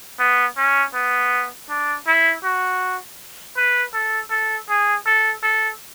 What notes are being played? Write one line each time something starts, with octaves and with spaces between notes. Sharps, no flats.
B3
C#4
B3
D4
E4
F#4
B4
A4
A4
G#4
A4
A4